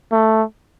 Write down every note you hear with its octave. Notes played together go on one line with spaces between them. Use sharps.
A3